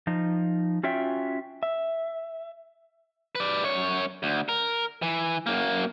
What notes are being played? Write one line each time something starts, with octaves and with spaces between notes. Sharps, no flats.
F3 D#4
C#4 F4 F#4 C#5 E5 G5
E5
B4 D5
F#2 C#5
D2
A#4
E3
F#2 A#3